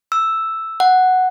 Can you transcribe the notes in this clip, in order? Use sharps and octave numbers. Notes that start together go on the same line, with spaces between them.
E6
F#5